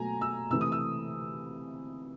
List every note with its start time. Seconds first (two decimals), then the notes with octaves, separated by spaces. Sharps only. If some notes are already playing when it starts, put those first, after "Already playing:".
Already playing: B2 F#3 A3 G#5 A#5
0.21 E6
0.50 C3 E3 A3 E6
0.61 D#6
0.72 E6